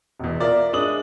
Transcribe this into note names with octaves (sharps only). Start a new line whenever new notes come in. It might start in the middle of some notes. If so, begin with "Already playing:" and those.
E1 E2
F4 A#4 D5 E5
G#3 D4 D#6 F#7